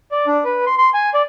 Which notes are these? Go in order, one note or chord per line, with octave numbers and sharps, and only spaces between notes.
D5
D4
B4
C6
C6
G#5
D5